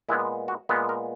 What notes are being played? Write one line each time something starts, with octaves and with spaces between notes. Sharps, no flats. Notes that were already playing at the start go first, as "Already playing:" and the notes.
A#2 G#3 B3 E4
F#4
A#2 G#3 B3
A#4